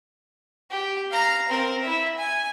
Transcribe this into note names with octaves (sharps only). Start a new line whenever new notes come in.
G4
F5 A#5
C4 A#4
E4 E5
G#5